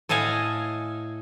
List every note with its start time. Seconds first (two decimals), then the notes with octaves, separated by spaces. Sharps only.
0.09 A2 A4 D#5 F5 G#5